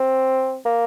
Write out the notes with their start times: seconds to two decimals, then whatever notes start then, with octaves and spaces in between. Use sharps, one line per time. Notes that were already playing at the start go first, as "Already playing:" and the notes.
Already playing: C4
0.66 A#3